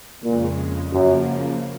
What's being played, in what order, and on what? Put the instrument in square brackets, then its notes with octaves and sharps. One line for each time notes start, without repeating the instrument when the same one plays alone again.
[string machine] F2 C#3 G#3 [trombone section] A#2
[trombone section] F#2 [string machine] C#3 F3 A#3